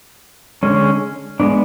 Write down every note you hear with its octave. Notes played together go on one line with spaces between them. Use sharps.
D3 G#3 C#4
G#3 B3 D4